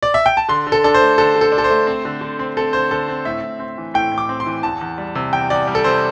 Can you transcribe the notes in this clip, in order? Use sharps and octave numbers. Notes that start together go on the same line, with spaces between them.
D5
E5
G5
A5
D3 C6
D3
A4
D4 A4
C5
A3
D3 A4
D3
A4
D4
A4
C5
A3
C4
D3
D3
C4
C4 A4
D3 C5
D3 A4
C4
A2 E5
A2
C4
E3
A2 G5
A2
D6
C4
C6
E3
E2 A5
E2
G3
C3
E2 G5
E2 D5
G3
A4
C3 C5